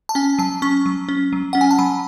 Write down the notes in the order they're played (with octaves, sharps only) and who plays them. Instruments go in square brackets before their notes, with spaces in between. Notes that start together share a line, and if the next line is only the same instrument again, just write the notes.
[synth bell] A5
C#4 G#5
F#3 A5
C#4 C#6
F#3
C#4
F#3
C#4 F#5
G#5
A5
F#3 B5